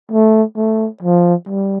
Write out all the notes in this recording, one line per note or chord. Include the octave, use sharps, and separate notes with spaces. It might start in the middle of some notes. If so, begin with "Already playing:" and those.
A3
A3
F3
G3